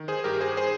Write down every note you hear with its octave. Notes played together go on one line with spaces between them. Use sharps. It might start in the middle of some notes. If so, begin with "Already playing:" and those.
Already playing: D#3
G#4 C5
G2 G4 A#4
G#4 C5
G#4 C5